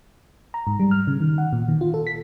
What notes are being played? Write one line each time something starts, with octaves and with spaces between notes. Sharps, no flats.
A#5
G#2
G3
F6
C#3
D#3
F#5
A#2
D#3
F4
A4
B6